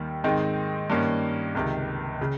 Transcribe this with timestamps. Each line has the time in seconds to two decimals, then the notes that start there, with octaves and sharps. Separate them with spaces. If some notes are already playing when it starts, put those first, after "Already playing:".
Already playing: D#2 D#3 G3
0.24 G#2 D#3 G#3 C4 D#4
0.90 G2 D#3 A#3 C#4
1.55 C#2 C3 D#3
2.21 C#3